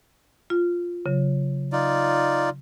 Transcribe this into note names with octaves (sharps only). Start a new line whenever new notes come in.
F4
C#3 F#3
D#4 F4 D5